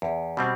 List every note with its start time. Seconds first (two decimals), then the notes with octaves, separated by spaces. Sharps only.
0.02 E2
0.37 B2 G3 C4